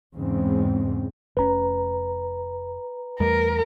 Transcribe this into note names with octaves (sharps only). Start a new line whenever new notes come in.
E2 G#2 C#3 C4
F1 C#4 B4 A#5
E2 G3 A3 A#4